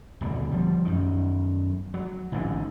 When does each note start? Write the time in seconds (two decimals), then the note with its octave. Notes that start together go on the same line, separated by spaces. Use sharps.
0.21 D#1 D2 B2 D3
0.51 F3 G3
0.85 F#2 D#3
1.94 F#3
2.32 A1 G#2 D3 D#3